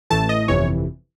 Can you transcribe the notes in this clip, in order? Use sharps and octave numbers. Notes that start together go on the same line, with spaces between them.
A1 A2 E3 A3 A5
D#5
G1 F2 C3 E3 C#5